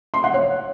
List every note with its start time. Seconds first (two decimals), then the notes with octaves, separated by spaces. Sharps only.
0.14 C6
0.24 F#5
0.34 C#5